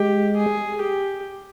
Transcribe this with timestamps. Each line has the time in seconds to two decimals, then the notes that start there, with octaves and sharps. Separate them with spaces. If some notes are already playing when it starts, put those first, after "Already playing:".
Already playing: G#3 G4
0.37 G#4
0.82 G4